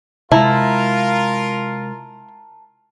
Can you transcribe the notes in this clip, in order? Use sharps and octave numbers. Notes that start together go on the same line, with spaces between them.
C3 G#3 E4 F4 A#4 A5 A#5